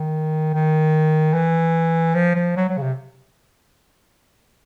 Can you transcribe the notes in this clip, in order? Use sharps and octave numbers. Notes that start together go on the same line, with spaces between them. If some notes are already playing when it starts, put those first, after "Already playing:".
Already playing: D#3
D#3
E3
F3
F3
F#3
F#3
C#3
C3